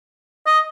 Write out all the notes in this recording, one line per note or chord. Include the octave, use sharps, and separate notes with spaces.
D#5